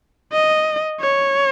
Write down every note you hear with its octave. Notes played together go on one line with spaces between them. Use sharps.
D#5
C#5